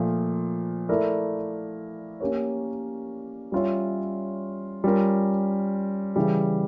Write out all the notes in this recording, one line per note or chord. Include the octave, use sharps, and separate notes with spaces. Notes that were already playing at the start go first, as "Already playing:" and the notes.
Already playing: A#2 F3 A3
A3 E4 A#4 D5
A#3 C#4 G4 A#4 C#5
G3 C#4 F4 C#5 E5
G3 C#4 F4 A#4
C#3 E3 G3